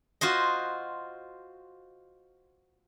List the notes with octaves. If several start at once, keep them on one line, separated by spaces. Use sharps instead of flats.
F4 F#4 C5 D#5